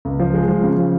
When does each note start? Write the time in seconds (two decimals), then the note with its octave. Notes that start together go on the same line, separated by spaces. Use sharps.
0.05 C#2
0.20 F3
0.34 G#3
0.48 F3
0.63 C#3
0.77 F3